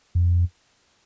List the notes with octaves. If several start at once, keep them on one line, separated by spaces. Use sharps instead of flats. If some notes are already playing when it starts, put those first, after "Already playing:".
F2